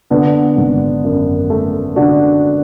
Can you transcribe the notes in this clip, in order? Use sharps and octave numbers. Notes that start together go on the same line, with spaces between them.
D3 B3 D4
G#1
F#2
A3
D3 D4 F#4